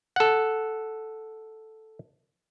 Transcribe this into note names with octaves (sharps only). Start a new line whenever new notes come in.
A4 F#5